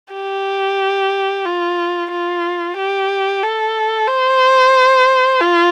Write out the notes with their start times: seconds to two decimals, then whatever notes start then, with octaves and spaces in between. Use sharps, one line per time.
0.14 G4
1.46 F4
2.12 F4
2.78 G4
3.43 A4
4.08 C5
5.41 F4